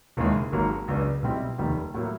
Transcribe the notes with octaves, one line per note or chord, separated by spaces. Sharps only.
E1 D#2 C#3 E3 G#3
G#1 G#2 D#3 F#3 A#3
C#2 C#3 F#3 B3 D4
B1 B2 G3 C4 E4
F1 D#2 D#3 G3
A2 F#3 A#3